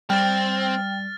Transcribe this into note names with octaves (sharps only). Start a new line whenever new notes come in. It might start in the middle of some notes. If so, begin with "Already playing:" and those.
G3 C4 G5 F6 A6